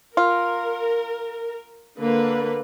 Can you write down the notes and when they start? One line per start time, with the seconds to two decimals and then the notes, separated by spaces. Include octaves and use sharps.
0.17 F4 A#4
1.99 D3 A#3 B4